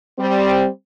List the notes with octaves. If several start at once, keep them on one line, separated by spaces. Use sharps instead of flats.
G3 C4